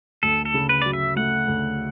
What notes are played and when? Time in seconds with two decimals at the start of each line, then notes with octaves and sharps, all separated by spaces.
0.23 D2 A4
0.45 A4
0.54 C#3
0.69 B4
0.82 F#3 D5
0.93 E5
1.16 A3 F#5
1.48 D2